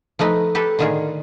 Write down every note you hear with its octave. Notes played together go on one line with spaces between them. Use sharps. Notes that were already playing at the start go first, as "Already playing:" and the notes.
F3 A3 D#4 B4
G4 A4 B4 E5
A2 D3 D#3 F4 G#4